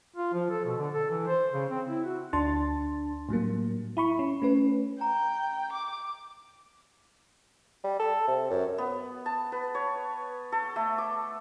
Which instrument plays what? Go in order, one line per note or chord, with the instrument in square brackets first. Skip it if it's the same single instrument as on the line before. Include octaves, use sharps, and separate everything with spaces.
[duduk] F4
F3
A4
B2
D3
A4
E3
C5
C#3
C4
E4
F#4
[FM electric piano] D2 D4 A5 C6 A6
A2 F#3 G3 A#3
E4 B5 C#6
C#4
A3 C#4 B4
[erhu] G5 [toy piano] A#5
[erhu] D6
[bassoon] G3
A4
C3
F#2
[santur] B3
A5
B4
C#5
A4
A3
D6